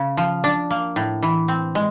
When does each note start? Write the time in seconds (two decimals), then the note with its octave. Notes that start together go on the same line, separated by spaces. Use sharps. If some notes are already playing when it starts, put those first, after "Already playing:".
Already playing: C#3
0.17 F3
0.44 D4
0.70 A#3
0.96 A2
1.23 E3
1.48 C4
1.75 G#3